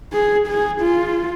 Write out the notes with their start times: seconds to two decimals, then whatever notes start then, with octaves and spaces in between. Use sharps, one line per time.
0.13 G#4
0.47 G#4
0.80 F4